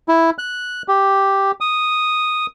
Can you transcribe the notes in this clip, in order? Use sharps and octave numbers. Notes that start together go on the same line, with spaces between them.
E4
F#6
G4
D#6